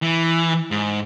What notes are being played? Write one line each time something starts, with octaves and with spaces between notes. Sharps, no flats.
E3
G#2